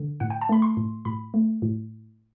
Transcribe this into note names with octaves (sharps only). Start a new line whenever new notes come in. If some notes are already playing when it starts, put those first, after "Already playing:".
Already playing: D3
A2 F#5
G5
A5
A3 B5
C6
A2
A2 B5
A3
A2